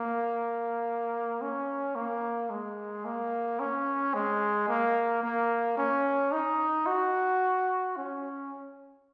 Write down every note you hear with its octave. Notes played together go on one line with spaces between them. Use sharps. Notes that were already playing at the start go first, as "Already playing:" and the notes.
Already playing: A#3
C#4
A#3
G#3
A#3
C#4
G#3
A#3
A#3
C#4
D#4
F#4
C#4